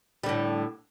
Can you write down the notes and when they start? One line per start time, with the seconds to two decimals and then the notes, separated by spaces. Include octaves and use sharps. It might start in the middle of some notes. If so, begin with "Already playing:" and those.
0.24 G3
0.26 D3
0.29 A2